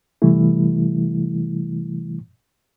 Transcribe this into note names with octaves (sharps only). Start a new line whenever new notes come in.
C3 E3 G3 A3 E4